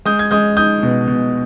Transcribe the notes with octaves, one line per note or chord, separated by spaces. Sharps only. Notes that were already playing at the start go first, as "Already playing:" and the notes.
G#3 D#6 G6
G#6
G#3 D#6 G6
D#4 D#6 G6
B2
B2